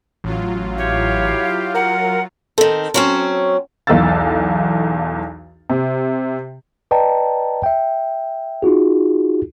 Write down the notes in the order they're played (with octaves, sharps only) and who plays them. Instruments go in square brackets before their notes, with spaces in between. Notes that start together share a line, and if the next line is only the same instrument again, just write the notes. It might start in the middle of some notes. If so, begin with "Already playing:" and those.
[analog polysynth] A1 [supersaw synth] F#3 F4
[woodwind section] E4 G4 F5 [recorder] C#5
[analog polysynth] A#4 [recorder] F#5
[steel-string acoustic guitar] D#3 C4 [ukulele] A4
[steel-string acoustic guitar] F#3 C4 C#4
[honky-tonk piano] B1 E2 A4 F5 E6 A6
C3
[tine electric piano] B4 D5 D#5 G5 A5 A#5
E5 G5
D#4 F4 F#4 G#4